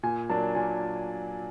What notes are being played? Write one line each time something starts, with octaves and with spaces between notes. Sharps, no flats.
A#2 G#5
F#3 A#3 D4 A5
A#2 G#5